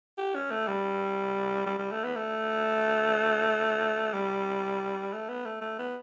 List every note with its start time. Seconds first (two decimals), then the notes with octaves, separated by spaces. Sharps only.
0.18 G4
0.35 C#4
0.51 A3
0.68 G3
1.66 G3
1.79 G3
1.92 A3
2.04 B3
2.16 A3
4.13 G3
5.13 A3
5.29 B3
5.46 A3
5.61 A3
5.79 B3